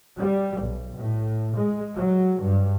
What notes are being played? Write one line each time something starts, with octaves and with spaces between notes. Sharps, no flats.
G3
B1
A2
G#3
F#3
G2